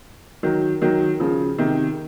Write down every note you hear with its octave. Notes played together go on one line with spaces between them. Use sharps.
D#3 F#3
D#3 F#3
C#3 F3
C3 D#3